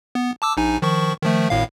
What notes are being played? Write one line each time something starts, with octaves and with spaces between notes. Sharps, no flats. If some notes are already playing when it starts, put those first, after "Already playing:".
B3
A5 D6 E6
A#1 D#4 G#5
D#3 F3 C#6
D#3 F3 A3
G#1 A2 F5